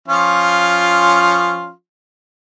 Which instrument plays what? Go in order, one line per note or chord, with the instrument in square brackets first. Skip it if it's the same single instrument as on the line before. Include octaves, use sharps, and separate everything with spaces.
[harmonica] F3 C#4 F4